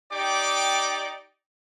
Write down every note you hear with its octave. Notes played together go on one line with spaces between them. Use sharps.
D#4 G4 D5 G5 D6